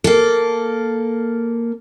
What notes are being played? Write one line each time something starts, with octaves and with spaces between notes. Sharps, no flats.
A#3 A4